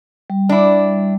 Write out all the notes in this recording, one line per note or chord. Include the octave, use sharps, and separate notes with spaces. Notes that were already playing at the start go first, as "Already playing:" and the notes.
G3
D4 E4